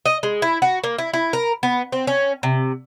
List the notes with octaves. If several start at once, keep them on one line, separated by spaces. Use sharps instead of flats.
D#5
G#3
E4
F#4
A#3
E4
E4
A#4
B3
C4
C#4
C3